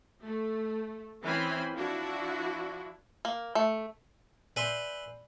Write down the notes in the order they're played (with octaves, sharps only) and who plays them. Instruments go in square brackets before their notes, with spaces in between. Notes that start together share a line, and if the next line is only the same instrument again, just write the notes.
[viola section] A3
E3 C4 C#4 C5 G#5 B5
F3 D4 E4 F#4
[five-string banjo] A#3
A3
[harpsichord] B4 E5 C6 [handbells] D5 G#5 B5